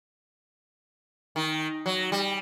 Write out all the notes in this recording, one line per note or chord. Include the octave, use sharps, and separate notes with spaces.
D#3
F#3
G3